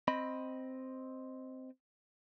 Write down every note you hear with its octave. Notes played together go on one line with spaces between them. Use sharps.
C4 D#5 B5